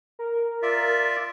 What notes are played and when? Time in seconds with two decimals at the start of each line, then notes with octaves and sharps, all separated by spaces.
0.19 A#4
0.62 F4 D5 E5